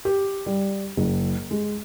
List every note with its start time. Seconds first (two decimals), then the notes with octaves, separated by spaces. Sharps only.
0.05 G4
0.46 G3
0.97 F#1
1.51 G#3